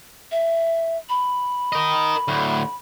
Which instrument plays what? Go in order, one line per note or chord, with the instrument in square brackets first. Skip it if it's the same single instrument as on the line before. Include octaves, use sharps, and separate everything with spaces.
[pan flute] E5
B5
[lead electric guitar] A#4 D#5
D2 A2